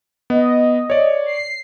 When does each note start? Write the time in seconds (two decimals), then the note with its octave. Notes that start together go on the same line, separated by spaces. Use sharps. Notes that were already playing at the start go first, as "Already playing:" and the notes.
0.30 B3 D#5
0.90 C#5 D5
1.26 C7